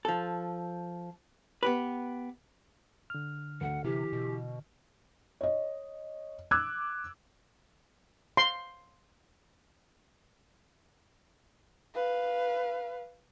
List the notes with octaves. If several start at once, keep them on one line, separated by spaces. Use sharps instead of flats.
F3 A4
B3 G4 B4
D3 F6
D2 F#5
C3 E3 G4
B2
C#5 D#5
D6 E6 F#6 G#6
C6
B4 F5